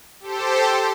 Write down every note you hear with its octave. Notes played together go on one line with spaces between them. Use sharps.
G4 A4 C5